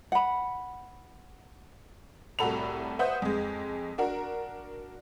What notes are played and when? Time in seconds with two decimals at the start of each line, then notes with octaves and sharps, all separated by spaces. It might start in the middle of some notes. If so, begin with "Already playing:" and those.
0.12 F#5 B5
2.39 C2 A2 F#4 A4 B5 F7
2.99 B4 C5 E5 F#5 D#6 G6
3.22 F2 G#3
3.98 D4 F#4 A#4